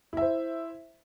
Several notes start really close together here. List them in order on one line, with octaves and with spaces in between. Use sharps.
E4 E5 C5